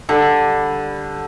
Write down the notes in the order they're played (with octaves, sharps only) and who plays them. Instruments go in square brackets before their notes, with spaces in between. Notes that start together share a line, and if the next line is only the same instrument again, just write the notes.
[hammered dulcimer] D3 G3